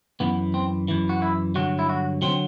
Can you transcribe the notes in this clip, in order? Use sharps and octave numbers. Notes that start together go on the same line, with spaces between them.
F#2 E3 B3
C4
F#2 E3
F#4
E4
G2 D3 F#3 F#4
E4
F#4
D3 F#3 C4